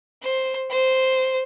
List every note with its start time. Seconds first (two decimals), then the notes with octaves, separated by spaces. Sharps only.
0.23 C5
0.70 C5